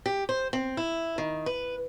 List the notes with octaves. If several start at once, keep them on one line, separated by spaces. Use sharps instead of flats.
G4
C5
C4
E4
D#3
B4